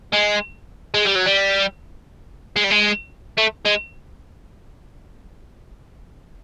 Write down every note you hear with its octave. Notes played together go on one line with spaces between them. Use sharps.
G#3
G#3
G3
F#3
G3
G#3
G3
G#3
A3
G#3